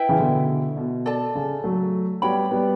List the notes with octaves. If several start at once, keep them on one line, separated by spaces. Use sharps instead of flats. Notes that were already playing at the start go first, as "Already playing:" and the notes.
Already playing: E4 B4 E5 G5
C#3 E3
B2 D3
B2
A4 D5 A5
C#3
F#3 A3
G3 B3 F#4 C#5 G5 B5
G3 B3